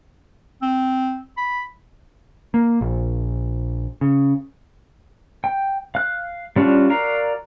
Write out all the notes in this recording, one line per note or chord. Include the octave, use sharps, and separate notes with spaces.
C4
B5
A#3
A#1
C#3
G5
F5 F#6
G3 C#4 D4 F4 F#4
F#4 A#4 D5 F5 A#5